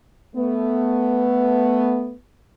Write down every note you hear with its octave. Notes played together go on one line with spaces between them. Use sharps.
A3 B3